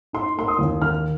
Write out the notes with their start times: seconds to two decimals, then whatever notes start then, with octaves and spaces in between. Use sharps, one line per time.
0.13 D#4 C6
0.37 A#3 C6
0.48 D#6
0.59 D#2
0.82 D#3 F6